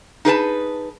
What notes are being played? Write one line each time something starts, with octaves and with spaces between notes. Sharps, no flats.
D#4 G#4 B4 A5